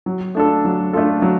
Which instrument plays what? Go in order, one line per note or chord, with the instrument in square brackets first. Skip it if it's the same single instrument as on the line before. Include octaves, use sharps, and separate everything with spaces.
[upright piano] F#3
A3 D4 F4 A4
F#3
A3 D4 F4 A4
F#3